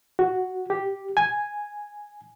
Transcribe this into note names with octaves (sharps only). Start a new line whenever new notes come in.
F#4
G4
G#5